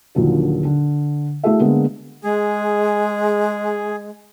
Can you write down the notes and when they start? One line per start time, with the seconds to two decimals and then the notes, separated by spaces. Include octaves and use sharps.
0.15 A#1 D#2 A#2 D3 F#3
0.65 D3
1.43 A3 E4 F#4 G#4 A4 E5
1.60 D3 G#3 A#3 B3
2.23 G#3 G#4